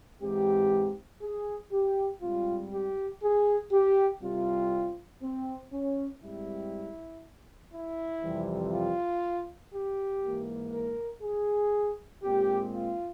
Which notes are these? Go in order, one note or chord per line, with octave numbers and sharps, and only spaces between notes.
G#2 E3 G#3 C4 G4
G#4
G4
G#2 G3 C4 F4
G4
G#4
G4
C2 C3 G3 C4 F4
C4
C#4
G#2 G3 C4 E4
E4
F2 C3 E3 G3 C4
F4
G4
G#2 E3 A#3
A#4
G#4
A#2 G#3 C4 G4
F4